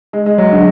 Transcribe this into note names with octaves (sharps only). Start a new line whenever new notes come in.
G#3
G#3
F#3
D3